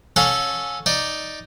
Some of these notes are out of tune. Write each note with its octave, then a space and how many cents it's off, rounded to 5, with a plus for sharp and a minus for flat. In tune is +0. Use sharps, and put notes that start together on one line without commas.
C#4 +0 A4 -10 F5 +40
D#4 +0 D5 +0